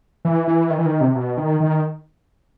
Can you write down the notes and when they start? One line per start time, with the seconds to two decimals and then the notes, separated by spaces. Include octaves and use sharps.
0.25 E3
0.47 E3
0.70 D#3
0.78 E3
0.86 D#3
1.01 C3
1.16 B2
1.37 D#3
1.60 D#3